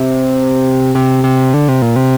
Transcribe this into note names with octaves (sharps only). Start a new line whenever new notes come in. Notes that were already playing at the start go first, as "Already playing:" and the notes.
Already playing: C3
C3
C3
D3
C3
A#2
C3